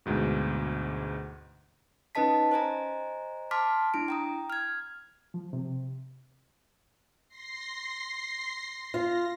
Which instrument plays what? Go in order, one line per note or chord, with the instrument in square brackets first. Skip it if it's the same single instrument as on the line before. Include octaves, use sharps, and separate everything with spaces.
[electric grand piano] D2 G#2 B2
[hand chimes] C#4 D#4 B4 D#5 A5 B6
C5 D#5 G#5 A#5
A5 C6 D6 F6 B6
D4 E4 D7
G5 A#5 D#6
F6 G#6
[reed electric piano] F3
C3
[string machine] C6 A#6 C7
[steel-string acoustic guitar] F4 [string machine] A#6